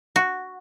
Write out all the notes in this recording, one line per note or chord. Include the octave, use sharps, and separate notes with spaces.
F#4